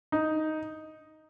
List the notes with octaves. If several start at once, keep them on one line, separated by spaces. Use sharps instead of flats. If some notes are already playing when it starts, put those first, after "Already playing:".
D#4